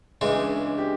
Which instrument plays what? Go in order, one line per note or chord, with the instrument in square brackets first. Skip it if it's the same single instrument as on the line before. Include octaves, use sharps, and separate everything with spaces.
[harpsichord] C#2 C#3 E3 G#3 [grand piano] D4
[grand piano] C#4
D4
G4